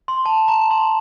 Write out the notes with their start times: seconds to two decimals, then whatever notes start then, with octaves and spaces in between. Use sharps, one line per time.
0.08 C6
0.26 A5
0.48 A#5
0.71 C6